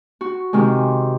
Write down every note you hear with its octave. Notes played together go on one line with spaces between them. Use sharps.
F#4
C3 D#3 G#3